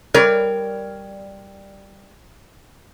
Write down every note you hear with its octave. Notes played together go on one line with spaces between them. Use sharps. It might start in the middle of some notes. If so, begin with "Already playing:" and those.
G3 A#4 C#5